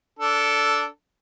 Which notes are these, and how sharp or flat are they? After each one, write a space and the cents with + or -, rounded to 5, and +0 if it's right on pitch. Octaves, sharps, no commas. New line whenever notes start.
D4 -15 A4 +5